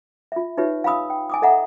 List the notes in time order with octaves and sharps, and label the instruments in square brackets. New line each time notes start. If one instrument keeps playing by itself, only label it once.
[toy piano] F4 E5
D#4 F4 G4 B4 C#5 E5
F5 G#5 B5 D#6 E6
G5
G#5 D6 D#6
A4 D#5 E5 F#5 A#5